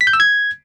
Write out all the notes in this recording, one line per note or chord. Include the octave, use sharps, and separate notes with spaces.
B6
G6
E6
G#6